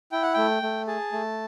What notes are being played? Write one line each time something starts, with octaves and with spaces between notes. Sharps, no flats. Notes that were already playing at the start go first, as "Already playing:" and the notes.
E4 G5
F#5
A3 G5
A3
G#4 A5
A3